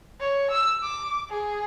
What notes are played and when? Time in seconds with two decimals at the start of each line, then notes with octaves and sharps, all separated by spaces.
0.20 C#5
0.50 E6
0.83 D6
1.30 G#4